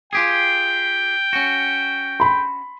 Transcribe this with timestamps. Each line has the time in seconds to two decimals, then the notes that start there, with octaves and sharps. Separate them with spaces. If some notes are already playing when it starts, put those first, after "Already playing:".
0.13 F4 G4 G#4 G5
1.33 C#4 F#4
2.20 B5 C6